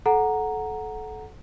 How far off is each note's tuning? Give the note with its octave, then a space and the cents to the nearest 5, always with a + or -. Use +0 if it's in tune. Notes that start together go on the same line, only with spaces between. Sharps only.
A4 -25 F#5 +0 A#5 +0